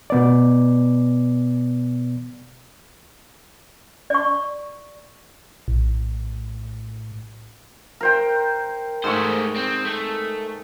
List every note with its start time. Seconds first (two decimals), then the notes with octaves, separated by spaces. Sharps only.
0.10 B2 B3 D5
4.10 D5 C#6
5.68 A#1 A2
8.01 A#4 C5 G5
9.04 G#2 A3 C5 C#6
9.56 C4
9.85 A3